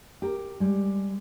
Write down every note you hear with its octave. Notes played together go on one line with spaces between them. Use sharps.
G4 A#4
G3 G#3